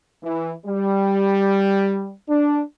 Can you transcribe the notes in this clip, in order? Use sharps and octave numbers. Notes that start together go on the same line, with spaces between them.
E3
G3
D4